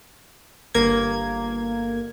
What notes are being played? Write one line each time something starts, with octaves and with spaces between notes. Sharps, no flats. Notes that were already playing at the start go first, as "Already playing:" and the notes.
G1 A#3 G#6